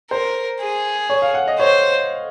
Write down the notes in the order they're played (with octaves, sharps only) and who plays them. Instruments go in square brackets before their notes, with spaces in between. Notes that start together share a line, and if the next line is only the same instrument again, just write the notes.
[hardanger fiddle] A#4 [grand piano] C5
[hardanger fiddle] G#4
[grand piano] C#5
F5
F#5
D#5
[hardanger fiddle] C5 [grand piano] C#5